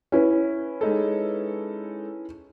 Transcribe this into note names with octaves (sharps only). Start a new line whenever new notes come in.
C#4 E4 B4
G#3 D#4 A4